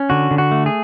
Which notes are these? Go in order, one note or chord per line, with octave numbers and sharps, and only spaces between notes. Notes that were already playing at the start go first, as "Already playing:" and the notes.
Already playing: C#4
D3 F#4
D3
F#4
A3
G#4